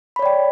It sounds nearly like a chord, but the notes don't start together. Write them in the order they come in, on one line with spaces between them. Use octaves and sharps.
B5 C#5 D5 G5